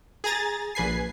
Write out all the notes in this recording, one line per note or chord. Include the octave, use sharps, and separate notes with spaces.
G#4 G#5 A#5 A6
A#1 B4 G#5 C7